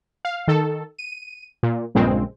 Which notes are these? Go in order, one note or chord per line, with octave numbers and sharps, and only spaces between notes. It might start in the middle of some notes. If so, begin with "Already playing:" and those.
F5
D#3 A4
D#7
A#2
A#1 G2 A#2 C#3 G#3 C4